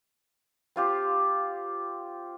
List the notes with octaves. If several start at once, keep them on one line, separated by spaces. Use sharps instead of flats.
C4 F4 G4